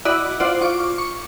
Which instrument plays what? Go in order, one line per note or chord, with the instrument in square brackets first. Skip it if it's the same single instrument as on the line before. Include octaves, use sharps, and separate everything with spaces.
[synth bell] E4 F#4 D5 D#5 F#5 B5
F4 C5 D5 F#5
F4 C#6 D6
C#6